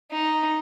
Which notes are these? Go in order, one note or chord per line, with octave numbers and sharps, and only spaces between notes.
D#4